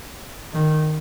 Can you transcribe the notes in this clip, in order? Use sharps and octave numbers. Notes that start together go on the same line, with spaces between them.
D#3